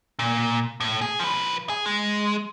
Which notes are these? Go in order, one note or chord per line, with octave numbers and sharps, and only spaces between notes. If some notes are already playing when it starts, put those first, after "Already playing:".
A#2
A2
G#4
F3 B4
G#4
G#3